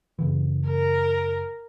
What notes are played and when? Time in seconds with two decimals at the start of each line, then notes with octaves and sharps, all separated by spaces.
0.19 F#1 C#3 E3
0.67 A#4